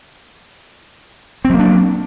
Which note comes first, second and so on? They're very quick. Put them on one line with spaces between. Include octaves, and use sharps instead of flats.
C4 F#3 A#3 D4